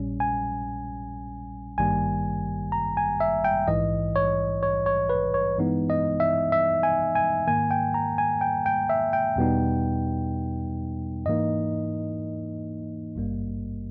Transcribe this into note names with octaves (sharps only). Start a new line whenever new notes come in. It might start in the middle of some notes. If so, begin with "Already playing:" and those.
Already playing: A#1 A#2 G3 C#4
G#5
G#1 G2 D#3 G3 A#3 G#5
A#5
G#5
E5
G5
A#1 G#2 E3 D#5
C#5
C#5
C#5
B4
C#5
G2 E3 G#3 B3 D#4
D#5
E5
E5
G#5
G#5
G#2 D#3 A#3 G#5
G5
A#5
G#5
G5
G5
E5
G5
E2 B2 G3 B3 D#4
G#2 E3 A#3 D#4 D#5
G#1 G2 G3 A#3